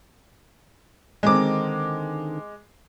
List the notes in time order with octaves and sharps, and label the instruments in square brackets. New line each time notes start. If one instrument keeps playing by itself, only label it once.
[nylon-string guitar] D3 D#3 C4 [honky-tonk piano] G#3 D6